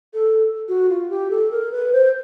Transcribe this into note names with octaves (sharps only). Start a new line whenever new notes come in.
A4
F#4
F4
G4
A4
A#4
B4
C5